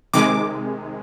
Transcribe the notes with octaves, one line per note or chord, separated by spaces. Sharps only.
C3 D#3 G#3 D6